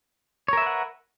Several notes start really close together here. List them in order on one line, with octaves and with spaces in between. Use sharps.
C#5 A#4 E5 B4 F#5